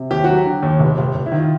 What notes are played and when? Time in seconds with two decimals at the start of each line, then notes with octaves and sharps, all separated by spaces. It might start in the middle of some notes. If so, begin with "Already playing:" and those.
Already playing: C3
0.10 D#2 G4
0.24 F#3 F#4
0.37 G4
0.45 D3
0.62 D#2
0.79 F1
0.98 F1
1.15 F1
1.26 E4
1.32 D#3
1.38 F4